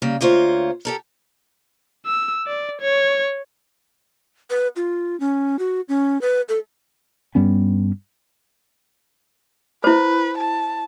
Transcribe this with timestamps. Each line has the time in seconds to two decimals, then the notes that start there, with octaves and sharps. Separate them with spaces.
0.02 C#3 G3 A#3
0.21 D2 A#3 F4 C5 C#5
0.85 G4 A4 A#4
2.06 E6
2.47 D5
2.81 C#5
4.50 B4
4.76 F4
5.20 C#4
5.59 F#4
5.89 C#4
6.21 B4
6.49 A4
7.35 G2 G3 B3 C#4
9.84 E4 B4 C5
10.37 A5